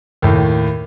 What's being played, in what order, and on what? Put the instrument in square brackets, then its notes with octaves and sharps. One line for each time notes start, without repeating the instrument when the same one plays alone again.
[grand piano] D#2 A2